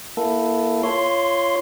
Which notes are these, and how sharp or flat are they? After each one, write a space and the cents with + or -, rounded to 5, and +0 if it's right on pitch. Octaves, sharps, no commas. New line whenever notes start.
A#3 +25 E4 +5 A4 +0
F4 -25 C#5 +0 C6 +0